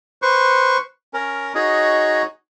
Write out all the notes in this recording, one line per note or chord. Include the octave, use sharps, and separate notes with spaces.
B4 C5 C#6
C#4 A#4
D#4 F#4 G#4 C#5 D#5